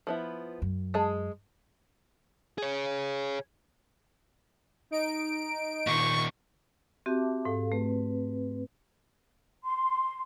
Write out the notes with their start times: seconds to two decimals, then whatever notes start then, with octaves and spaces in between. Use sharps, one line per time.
0.07 F3 B3 E4
0.62 F#2
0.94 G#3 G#4 A5
2.58 G#4 C#5
4.91 D#4 D7
5.87 A#2 D#3 C#6
7.06 C4 F#4 G4 E5 A5 D6
7.45 G#2 A4 F5
7.72 A3 C4 B4
9.63 C6